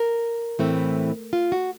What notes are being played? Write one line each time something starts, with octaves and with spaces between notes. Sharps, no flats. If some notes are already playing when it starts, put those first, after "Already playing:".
Already playing: A#4
A2 E3 A3 C4
F4
F#4